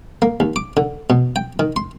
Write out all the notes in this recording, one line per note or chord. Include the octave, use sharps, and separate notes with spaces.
A#3
D#2
D6
D3
B2
G5
D#3
C6